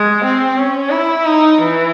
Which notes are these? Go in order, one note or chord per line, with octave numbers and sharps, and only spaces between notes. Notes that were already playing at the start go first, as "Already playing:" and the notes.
Already playing: G#3
C4
C#4
E4
D#4
E3